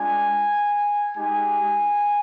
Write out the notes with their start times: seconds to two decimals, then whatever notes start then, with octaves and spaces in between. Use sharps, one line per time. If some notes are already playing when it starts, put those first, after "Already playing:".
Already playing: G#3 D4 F4 G#5
1.15 G#3 D#4 G4 G#5